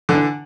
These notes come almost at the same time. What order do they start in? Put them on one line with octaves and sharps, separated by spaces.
D3 E3 D4